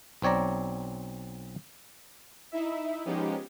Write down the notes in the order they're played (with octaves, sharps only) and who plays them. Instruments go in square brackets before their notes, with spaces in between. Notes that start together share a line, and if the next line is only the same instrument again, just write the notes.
[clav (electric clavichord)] B1 C4 C#5 D5 A#5
[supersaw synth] D#4 E4 E5
F3 G#3 B3 C#4 D#4 G4